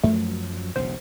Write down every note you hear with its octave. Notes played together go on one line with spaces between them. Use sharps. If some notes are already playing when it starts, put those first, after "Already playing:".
F#2 F3 F#3 A3
E1 B1 C#3 C5